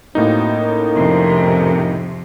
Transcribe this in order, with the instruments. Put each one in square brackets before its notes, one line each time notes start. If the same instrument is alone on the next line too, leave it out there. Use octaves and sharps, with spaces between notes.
[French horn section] F#2 C4 [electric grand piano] A2 A#3 D#4
[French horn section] C#4 A4 A#4
[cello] F2 C3